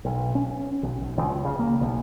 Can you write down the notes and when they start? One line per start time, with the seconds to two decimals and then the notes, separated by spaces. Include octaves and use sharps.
0.05 B1
0.35 C#4
0.83 B1
1.01 B1
1.18 C#2
1.45 C#3
1.59 A#3
1.81 B1